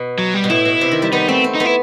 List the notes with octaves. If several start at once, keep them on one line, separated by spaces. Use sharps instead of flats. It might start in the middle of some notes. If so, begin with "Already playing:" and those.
Already playing: B2
F#3
G3
B2
A2 E4
B2
C3
D#3
G3
B3 D#4
A3 C4
C4
D#4
B3
E4